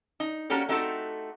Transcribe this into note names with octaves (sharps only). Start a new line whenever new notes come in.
D#4
A#3 C#4 F#4 G4 A4
A3 C4 D#4 F#4 G4 A4